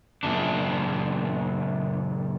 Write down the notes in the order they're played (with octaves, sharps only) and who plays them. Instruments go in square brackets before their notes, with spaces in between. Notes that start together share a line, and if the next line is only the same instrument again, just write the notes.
[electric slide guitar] F#2 A#2 C#3 D4